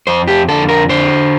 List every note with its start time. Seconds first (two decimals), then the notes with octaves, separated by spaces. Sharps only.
0.07 F2 C5
0.27 G4
0.49 D3 A4
0.68 A#4
0.89 D3 C5